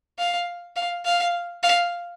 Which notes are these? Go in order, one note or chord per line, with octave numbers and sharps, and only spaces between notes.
F5
F5
F5
F5